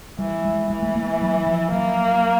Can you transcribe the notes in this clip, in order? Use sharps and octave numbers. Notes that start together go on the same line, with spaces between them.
E3 G3
G#3
E3 G#3
A3
A#3
F#3
F3
F#3 A#3